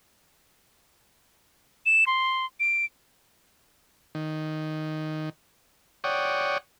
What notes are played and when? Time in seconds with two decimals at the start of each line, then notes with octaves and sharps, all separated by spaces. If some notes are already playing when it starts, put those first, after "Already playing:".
1.86 E7
2.07 C6
2.60 D7
4.15 D#3
6.04 C#5 D5 F#5 G5 C#6 D#6